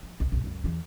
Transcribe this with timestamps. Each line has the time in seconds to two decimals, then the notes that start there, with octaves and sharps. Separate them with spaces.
0.03 F3
0.20 C2
0.32 B1 G2
0.44 C#2 F#2
0.64 E2 E3